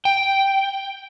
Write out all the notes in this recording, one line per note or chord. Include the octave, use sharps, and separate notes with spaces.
G5